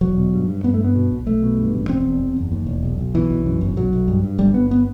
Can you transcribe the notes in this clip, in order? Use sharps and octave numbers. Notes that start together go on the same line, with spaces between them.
E1 F#3
B2
G2
G2
G2 B3
A3
G2 B3
B2
B1
B1 A3
B2
G2
A1
E1 C4
E2
E2
F#1
D#2
E1
B1
B1
B2 E3
B1
F#2
G1
B1 F#3
B1
G2
G2
G1 G3
G1 B3
B3